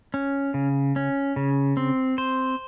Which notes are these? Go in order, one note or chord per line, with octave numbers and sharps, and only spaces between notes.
C#4
C#3
C#4
C#3
C4
C5